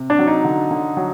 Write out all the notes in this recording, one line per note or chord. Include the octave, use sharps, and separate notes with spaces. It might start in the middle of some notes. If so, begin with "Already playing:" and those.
Already playing: C3
D4
F#3
D#4
D3
D3
F#3